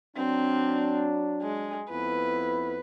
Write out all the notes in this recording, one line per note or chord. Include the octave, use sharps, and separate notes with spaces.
F#3 C4 D4
G#3
F2 B3 E4 B4